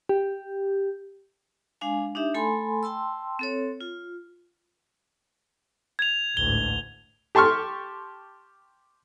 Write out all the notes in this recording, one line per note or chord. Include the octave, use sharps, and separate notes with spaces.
G4
G#3 D4 F5 G#5
D4 D#4 G4 E5
A3 A4 G#5 B5 C6
G5 A5 C6 E6
C4 A4 C#5
F4
G#6 F7
A1 D2 G#2 G7
G4 A5 C6 C#6 F6